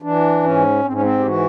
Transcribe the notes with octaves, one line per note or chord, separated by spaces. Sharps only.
E3 D4
G#2 C#4
G#2 C4
C#4
C4
G4
E3 F#4